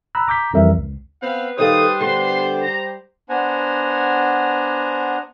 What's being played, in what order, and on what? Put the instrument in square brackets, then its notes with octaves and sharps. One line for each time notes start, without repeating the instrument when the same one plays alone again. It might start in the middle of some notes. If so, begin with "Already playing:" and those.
[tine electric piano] A#5 B5 E6 F#6
A#5 D6 G6 B6
F2 E3 F3 G3 A#4 E5
C#2
[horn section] B3 C4 F5 [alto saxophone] B4
[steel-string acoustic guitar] D#3 A4 F5 [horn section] G3 G4 C5 [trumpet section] A3 D#6
[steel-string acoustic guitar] D3 B3 [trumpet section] C6
[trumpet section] A#5
[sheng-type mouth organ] B3 D4 C5 F#5 G#5 A#5